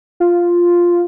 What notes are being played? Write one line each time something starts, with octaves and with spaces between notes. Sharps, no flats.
F4